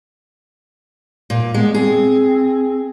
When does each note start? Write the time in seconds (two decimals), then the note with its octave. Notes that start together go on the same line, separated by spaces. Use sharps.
1.30 A#2
1.54 G#3 B3
1.74 C4 G#4